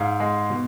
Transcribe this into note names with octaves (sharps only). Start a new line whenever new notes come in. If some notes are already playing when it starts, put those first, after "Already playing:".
Already playing: G#2 F5
G#3
B2